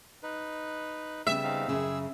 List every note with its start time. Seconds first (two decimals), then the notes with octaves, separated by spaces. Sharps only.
0.23 D#4 B4
1.27 C#3 G3 B3 E5 E6
1.44 C4 D#4 F5
1.68 F#2 C#3 G#4 E6